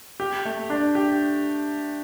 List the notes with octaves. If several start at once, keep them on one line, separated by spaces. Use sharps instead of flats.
G4
A3
D4
G4